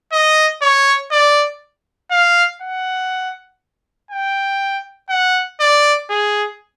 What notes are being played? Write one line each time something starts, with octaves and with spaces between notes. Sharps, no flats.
D#5
C#5
D5
F5
F#5
G5
F#5
D5
G#4